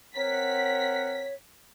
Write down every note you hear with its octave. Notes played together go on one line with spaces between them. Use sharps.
C4 A#4 C#5 F#5 B6